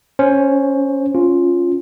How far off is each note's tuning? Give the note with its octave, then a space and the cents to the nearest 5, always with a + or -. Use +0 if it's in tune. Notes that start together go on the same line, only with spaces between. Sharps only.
C#4 +0 C5 +15
C#4 +0 F4 +0